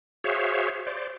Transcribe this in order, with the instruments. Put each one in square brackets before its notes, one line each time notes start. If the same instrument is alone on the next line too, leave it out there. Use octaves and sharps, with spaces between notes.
[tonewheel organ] F#4 G#4 C5 C#5 E5 F5
C5 D5